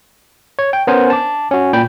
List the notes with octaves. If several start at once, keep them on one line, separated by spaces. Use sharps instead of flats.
C#5
G5
B3 C#4 A#4 C5 G#5
A5 D6
C#4 F#4
A#2 G5 B5 G6